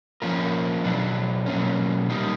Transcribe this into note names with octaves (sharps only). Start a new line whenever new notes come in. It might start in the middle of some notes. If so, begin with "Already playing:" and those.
F3 A#3 C#4 F4 A#4
B2 F#3 B3 D4
B2 F#3 A#3 C#4
G3 A#3 D#4 G4